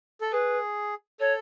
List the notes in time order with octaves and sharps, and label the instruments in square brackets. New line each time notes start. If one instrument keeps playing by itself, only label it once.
[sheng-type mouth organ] A4
[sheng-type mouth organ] G#4 [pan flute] B4
[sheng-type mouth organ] A4 [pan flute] C#5